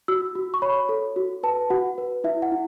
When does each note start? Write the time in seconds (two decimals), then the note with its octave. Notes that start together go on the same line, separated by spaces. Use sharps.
0.08 F#4 E6
0.35 F#4
0.54 C#6
0.62 C#5 B5
0.89 A4
1.16 F#4
1.43 B4 A5
1.70 F#4 F#5
1.98 B4
2.24 E4 E5
2.42 F#5
2.52 E4